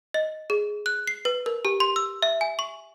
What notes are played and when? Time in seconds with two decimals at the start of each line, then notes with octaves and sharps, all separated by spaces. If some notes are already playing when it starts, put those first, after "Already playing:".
0.14 D#5
0.50 G#4
0.86 F#6
1.07 C7
1.25 B4
1.46 A#4
1.65 G4
1.80 C6
1.96 E6
2.22 E5
2.41 G#5
2.59 C#6